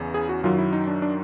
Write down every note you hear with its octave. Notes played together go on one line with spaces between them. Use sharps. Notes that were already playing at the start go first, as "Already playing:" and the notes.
Already playing: E2 C#3 E3
G#4
F#4
F#2 D#3 F#3 F4
E4
D#4
D4
D4